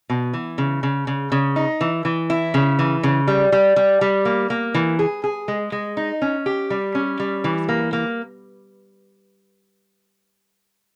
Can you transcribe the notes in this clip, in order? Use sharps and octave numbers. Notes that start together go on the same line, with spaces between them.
B2
E3
C#3
C#3
C#3
C#3
D#4
E3
E3
E4
C#3
E3
C#3
G3
G3
G3
G3
A#3
A#3
E3
G#4
G#4
G#3
G#3
D#4
C#4
G4
G3
C#4
G3
E3
A#3
A#3